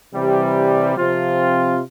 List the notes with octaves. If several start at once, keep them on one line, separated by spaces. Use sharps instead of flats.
C3 E3 G3
C3 F3 C4 F4